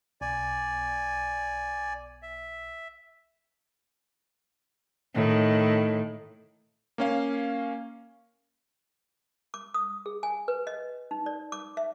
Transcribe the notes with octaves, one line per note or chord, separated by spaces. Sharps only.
B1 D5 G#5
E5
A2 D#3
A#3 C#4 F5
D6
D#6
G#4
G#5
B4
D#5
D#4
D5
D6
E5